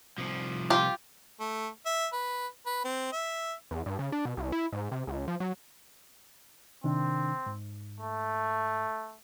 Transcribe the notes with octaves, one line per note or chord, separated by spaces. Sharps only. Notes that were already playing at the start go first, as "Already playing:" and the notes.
C2 F3
F4 G4
A3
E5
B4
B4
C4
E5
E2
G2
C#3
D4
B2
C2
E4
G#2
C3
C#2
F3
F#3
C3 D#3 C4 D4
G#2
A3